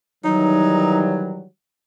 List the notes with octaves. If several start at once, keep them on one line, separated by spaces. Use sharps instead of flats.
D#3 E3 F#3 G3 D#4